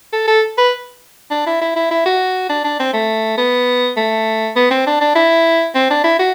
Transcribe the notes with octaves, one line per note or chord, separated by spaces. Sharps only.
A4
A4
B4
D4
E4
E4
E4
E4
F#4
D4
D4
C4
A3
B3
A3
B3
C4
D4
D4
E4
C4
D4
E4
F#4